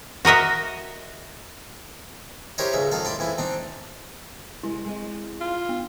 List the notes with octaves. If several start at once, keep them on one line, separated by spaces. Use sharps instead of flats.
F#4 A#4 D#5 E5
E4 G4 A#4 C5 C#5 D#5
C#2 G#2 E5
F2 D#3 A4 F5
E4 D5 C6
F2 E3 E4
C4 D4 D#4
C3 G#3 E4 A#4
G#3 C4 D#5
F4
B3